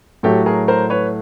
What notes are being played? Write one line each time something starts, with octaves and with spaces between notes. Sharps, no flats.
A2 F#3 A3 G4 A4
G#4 A#4
A#4 C5
B4 C#5